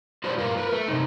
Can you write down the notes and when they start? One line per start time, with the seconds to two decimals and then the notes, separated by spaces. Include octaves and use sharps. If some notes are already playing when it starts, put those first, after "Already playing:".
0.24 F4 G4 B4 C5 D5
0.37 G2 F4 A#4
0.57 A#4 B4
0.72 A3
0.88 A2 C3 G#3 D#4